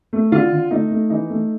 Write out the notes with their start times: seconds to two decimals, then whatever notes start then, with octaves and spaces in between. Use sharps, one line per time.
0.13 A3
0.32 D3 F4
0.52 D3
0.71 A3 D#4
0.91 A3
1.10 E3 D#4
1.30 A3